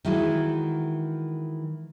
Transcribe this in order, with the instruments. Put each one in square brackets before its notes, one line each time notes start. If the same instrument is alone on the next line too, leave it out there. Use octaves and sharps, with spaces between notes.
[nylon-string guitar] D#3 E3 G#3 E4 F#4